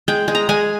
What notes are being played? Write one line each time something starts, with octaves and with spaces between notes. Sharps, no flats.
G#3 G5
G#3
A#5
G#3 G#5